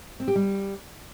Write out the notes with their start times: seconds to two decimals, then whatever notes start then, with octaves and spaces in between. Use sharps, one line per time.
0.20 C4
0.28 G4
0.36 G3